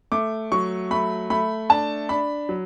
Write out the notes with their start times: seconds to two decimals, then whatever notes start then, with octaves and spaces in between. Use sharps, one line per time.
0.12 A3 D6
0.52 F#3 C#6
0.91 A3 B5
1.30 A3 B5
1.69 D4 A5
2.09 D4 B5
2.49 F#3